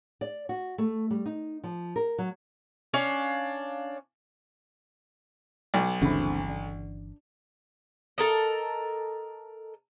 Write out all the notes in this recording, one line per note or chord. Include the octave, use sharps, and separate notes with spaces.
D5
F#4
A3
G3
D#4
F3
A#4
F#3
C#4 D4 F5
B1
G1 D2 C#3 E3 C4 B5
D4
A4 A#4 D#5